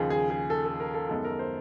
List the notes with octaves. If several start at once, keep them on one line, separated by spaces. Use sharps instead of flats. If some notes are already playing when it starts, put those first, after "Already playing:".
Already playing: D#2 C#3 F3 G#4
G#4
G#4
A4
A4
A#4
A4
F#2 D#3 G#3 B3 A4
A#4
C5